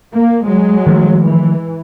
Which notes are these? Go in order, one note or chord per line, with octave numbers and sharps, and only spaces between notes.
A#3
F#3 G#3
D#3 F3 A3
E3